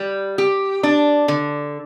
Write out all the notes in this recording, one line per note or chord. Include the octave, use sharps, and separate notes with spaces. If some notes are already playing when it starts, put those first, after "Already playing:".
Already playing: G3
G4
D4
D3